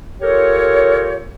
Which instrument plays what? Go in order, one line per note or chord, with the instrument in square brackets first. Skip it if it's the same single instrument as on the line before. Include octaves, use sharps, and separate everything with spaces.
[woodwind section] F4 G4 A4 A#4 C#5